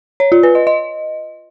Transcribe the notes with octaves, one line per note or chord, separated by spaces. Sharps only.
C#5
F4
B4
D#5
D#5